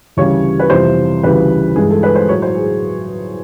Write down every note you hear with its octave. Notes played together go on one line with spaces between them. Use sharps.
D2 C#3 E3 G3 C#5
B4
F2 C3 E3 G3 C5
D2 C#3 E3 G3 B4
G2 E3 G#3 G#4
A4
B4
C5
A2 F#3 C#5
C5
G#4